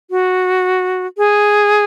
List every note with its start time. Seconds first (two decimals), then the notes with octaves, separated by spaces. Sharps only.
0.11 F#4
1.18 G#4